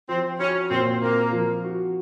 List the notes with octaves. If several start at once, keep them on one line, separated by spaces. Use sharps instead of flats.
F3 C4
C#4 F#4
A#2 C4
A#3 C4
F3
F#4